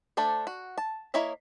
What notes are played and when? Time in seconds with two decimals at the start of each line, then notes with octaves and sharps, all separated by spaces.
0.17 A3 D4 A4 C5
0.47 F#4
0.78 A5
1.14 A#3 E4 C#5 D#5 E5